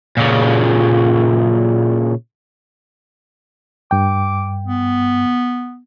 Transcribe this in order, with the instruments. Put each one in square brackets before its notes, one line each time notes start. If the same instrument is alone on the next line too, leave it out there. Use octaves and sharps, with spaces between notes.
[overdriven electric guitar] A#2 C#3
[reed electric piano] G2 G5 [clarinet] D6
[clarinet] B3